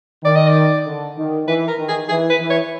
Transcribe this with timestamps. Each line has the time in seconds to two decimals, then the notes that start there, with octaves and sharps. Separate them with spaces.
0.24 D#3 D5
0.36 D#5
0.48 D5
0.85 D3
1.17 D#3
1.47 E3 B4
1.68 A#4
1.78 D#3
1.89 G#4
2.09 E3 G#4
2.30 B4
2.40 E3
2.50 C#5